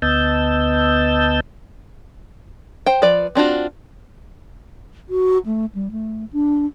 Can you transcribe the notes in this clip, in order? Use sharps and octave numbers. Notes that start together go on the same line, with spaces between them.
D2 B3 D#5 A5 E6 G6
C5 G5
F3 B4 D5
C4 D4 F4 F#4
F#4
A3
G3
A3
D4